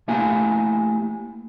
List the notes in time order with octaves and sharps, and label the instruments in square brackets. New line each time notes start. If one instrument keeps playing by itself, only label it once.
[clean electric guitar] A3 A#3 E4 G4 G#5